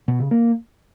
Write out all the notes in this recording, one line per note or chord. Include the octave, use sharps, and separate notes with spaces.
B2
C#3
A#3